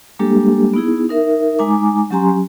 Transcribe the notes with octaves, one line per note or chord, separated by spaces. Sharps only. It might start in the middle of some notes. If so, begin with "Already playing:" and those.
G3 G#3 A#3 D4 G4 A4
B3 D#4 E4 G#4
D#4 A#4 E5
G#3 D#4 G#5 A#5 D6
F#3 C#4 G4 G#5 A#5 C6